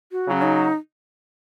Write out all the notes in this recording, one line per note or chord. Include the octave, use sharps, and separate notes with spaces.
F#4
C#3 F#3 C#4
D#4